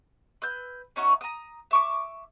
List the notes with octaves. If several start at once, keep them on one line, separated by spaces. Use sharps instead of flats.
B4 E6 G6
C#4 D#4 F#4 E5
A#5 D#6
E5 C#6 D6